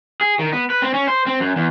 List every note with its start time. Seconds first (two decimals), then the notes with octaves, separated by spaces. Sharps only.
0.21 G#4
0.39 D#3
0.53 B3
0.70 B4
0.82 C4
0.94 C#4
1.08 C5
1.27 C4
1.40 F#2
1.56 E2